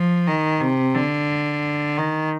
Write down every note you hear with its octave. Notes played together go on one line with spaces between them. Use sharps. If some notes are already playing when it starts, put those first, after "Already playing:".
Already playing: F3
D#3
C3
D3
D#3